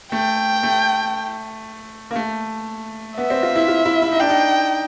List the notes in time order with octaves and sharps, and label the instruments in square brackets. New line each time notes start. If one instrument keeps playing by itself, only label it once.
[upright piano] A3 [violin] G5
[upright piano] A3
A#3
A3
[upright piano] B3 [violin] E5
[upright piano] C4
F4
E4
F4
E4
E4
D#4
[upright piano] D4 [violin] G5
[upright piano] D#4